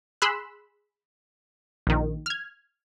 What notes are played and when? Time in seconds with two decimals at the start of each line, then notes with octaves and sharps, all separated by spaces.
0.22 G#4 B5 C6 E6 F#6
1.87 A#1 D#3
2.26 F6 G#6